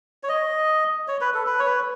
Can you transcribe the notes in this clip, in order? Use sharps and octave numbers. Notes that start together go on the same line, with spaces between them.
C#5
D#5
C#5
B4
A4
B4
C#5
B4